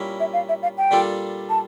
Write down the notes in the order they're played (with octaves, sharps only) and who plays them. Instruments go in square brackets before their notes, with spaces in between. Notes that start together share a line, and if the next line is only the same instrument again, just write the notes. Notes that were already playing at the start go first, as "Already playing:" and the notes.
Already playing: [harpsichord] A#2 G3 C#4 E4 A#4
[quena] E5
F5
E5
F5
G5
[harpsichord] A#2 G3 D4 F4 A4
[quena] A5